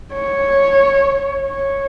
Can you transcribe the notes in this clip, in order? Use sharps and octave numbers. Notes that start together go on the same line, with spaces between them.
C#5
C#5